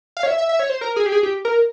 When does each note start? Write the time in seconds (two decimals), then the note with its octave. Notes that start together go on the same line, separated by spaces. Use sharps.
0.17 F5
0.23 C#5
0.28 E5
0.38 E5
0.49 E5
0.59 C#5
0.69 C5
0.81 A#4
0.96 G#4
1.06 G4
1.12 G#4
1.23 G4
1.45 A#4